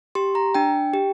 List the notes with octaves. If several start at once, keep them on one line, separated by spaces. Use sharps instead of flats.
G4 C6
A#5
D4 G5
G4